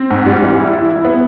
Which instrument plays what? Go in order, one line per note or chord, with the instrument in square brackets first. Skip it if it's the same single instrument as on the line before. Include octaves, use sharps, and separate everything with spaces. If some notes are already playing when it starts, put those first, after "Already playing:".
Already playing: [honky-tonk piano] C4
G#2
G3
E3
E4
E4
E4
B3